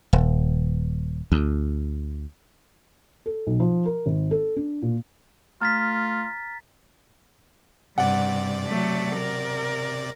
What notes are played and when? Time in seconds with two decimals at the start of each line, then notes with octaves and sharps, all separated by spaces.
0.13 D#1
1.32 D2
3.26 A4
3.47 B1
3.60 F3
3.85 A#4
4.06 G#1
4.31 A4
4.56 D4
4.82 A#2
5.61 A3 F4 A#5 F6 A6 B6
7.98 G2 C3 D5 F#5
8.67 F#3 A3
9.17 A#4